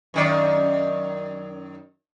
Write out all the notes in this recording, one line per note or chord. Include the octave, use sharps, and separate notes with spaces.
F#2 D#3 D5